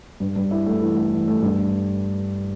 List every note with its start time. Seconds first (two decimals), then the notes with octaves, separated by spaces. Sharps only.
0.20 G2
0.36 G2
0.51 E4
0.66 A3
0.81 E3
0.96 A3
1.12 E3
1.28 A3
1.42 G2